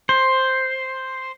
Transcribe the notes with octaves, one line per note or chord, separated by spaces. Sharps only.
C5